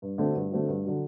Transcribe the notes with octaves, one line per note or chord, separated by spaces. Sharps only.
G2
D3 A3 C4 F#4
G2
D3 A3 C4 F#4
G2
D3 F#3